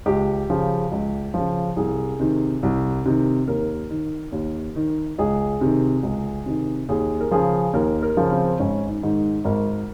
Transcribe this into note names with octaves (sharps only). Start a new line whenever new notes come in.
C#2 G4
C#3 F3
C#2
C#3 F3
C2 G#4
C3 D#3
C2
C3 D#3
D#2 A#4
D#3
D#2
D#3
C#2 G#4
C3 D#3
C#2
C3 D#3
D#2 G#4
A#4
C#3 F3 G#4
D#2 A#4
A#4
C#3 F3
C4
G#1 C#4
D#4
G#2 D#3
G#1 A#4